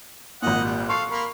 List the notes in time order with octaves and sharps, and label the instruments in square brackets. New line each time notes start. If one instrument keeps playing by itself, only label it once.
[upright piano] G#1 A#2 [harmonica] D#5 F#5
[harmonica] G3
[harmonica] A4 F5 [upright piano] C6 C#6 C7
[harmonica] A#3 A#4 B5